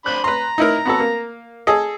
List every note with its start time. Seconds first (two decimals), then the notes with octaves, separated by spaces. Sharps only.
0.06 D4 C5 B5 F#6
0.24 B4 A#5 C6
0.58 D#4 E4 A#4
0.85 B3 F#4 A4
1.00 A#3
1.67 G#4 A4 D#5